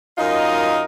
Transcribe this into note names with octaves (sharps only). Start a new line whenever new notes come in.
F#2 D#4 F4 A#4 D#5